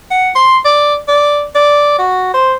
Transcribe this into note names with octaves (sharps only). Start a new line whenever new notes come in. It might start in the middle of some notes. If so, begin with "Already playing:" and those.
F#5
C6
D5
D5
D5
F#4
C5